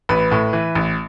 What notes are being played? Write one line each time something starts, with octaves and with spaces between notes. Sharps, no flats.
A1 B4
A2
E3
A1